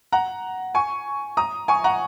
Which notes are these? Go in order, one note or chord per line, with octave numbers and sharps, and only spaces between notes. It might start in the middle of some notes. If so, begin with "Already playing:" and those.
F#5 A#5
G#5 C#6
A#5 D#6
G#5 C#6
F#5 A#5